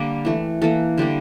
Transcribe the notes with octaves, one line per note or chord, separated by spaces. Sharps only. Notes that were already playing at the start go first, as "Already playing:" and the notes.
Already playing: D3 G3 A#3
E3 A3
E3 A#3 A4
D3 G3 A#3